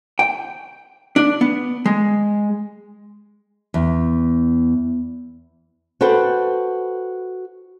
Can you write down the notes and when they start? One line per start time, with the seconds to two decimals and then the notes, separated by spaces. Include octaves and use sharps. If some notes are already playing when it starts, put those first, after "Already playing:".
0.19 G5
1.16 D4
1.41 B3
1.86 G#3
3.74 E2
6.01 F#4 A4 B4 C5 G5